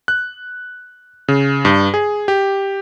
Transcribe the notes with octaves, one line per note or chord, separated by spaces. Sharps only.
F#6
C#3
G2
G#4
G4